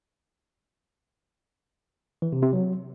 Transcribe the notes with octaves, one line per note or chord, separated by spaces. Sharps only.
E3
C3
C3
F#3